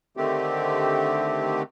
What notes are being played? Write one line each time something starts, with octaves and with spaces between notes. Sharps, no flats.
D3 D#3 A3 C4 G4